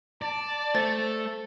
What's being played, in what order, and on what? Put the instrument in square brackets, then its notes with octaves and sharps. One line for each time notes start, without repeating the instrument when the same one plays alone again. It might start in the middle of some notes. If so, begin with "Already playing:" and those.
[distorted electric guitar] D5 [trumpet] A5
[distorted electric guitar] A3 [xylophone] C5 A6